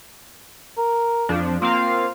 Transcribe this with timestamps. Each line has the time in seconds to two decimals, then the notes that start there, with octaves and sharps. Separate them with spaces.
0.78 A#4
1.29 F2 F3 D4
1.62 A#3 C4 F4 F5